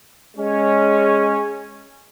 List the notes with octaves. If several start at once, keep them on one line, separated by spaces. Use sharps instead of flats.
G#3 C#4